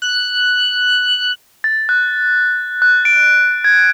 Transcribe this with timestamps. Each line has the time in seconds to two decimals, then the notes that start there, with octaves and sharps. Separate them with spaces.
0.02 F#6
1.64 A6
1.89 F#6
2.82 F#6
3.05 D7
3.64 G#6